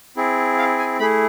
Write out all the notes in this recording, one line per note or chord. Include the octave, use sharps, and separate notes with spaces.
C4 E4 G#4
F5
G#5
A3 E4 G#4 B5